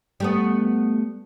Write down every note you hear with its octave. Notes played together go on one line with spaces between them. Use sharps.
G3 A3 B3